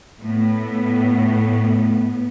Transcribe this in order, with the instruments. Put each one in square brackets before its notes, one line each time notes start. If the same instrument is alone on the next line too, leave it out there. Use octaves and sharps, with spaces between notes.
[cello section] A2 B3